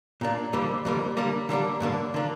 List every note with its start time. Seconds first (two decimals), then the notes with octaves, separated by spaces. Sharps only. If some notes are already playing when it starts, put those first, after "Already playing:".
0.21 A#2 A#3 D4
0.53 F2 D3 G3 A#3
0.85 F2 D3 G3 A#3
1.17 D3 G3 A#3 D4
1.49 D3 G3 A#3 D4
1.80 G2 D3 A#3 D4
2.14 D3 A#3 D4